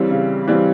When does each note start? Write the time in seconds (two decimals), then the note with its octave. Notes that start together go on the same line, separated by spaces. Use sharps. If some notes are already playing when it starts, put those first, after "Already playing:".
Already playing: C#3 E3 G3 C4
0.11 C#3
0.48 E3 G3 C4